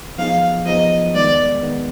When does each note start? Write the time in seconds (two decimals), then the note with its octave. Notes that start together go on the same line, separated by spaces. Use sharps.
0.18 F3 B3 D#4 G#4 F5
0.66 F3 B3 D#4 G#4 D#5
1.14 D#3 G#3 B3 D5
1.63 D#3 G#3 B3